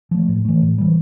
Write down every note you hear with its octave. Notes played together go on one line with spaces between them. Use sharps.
F3 A3
A2
E3 A3
A2
E3 G3